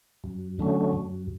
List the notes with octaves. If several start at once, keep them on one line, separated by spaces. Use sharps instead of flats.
F#2
D3 F#3 A3 C#4
F#2